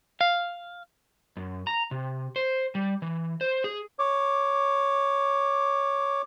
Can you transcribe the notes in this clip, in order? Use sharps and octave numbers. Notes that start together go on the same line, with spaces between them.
F5
F#2
A#5
C3
C5
G3
E3
C5
G#4
C#5 D6